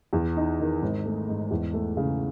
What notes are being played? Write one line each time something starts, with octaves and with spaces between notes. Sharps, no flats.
E2
D#4
D#3
G#1
A3
G#2
E2
A3
C#3